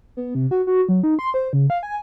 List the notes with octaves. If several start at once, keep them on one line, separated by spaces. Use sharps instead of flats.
B3
C3
F#4
F#4
F#3
D#4
C6
C5
C#3
F5
G#5